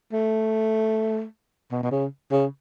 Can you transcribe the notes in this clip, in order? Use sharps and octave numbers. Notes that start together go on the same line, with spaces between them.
A3
B2
B2
C#3
C#3